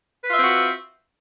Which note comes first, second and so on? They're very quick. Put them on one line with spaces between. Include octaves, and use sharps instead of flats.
B4 F4 E5 C4 F#4